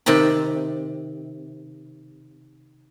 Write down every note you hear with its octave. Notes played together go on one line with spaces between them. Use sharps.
C3 D#3 A5 B5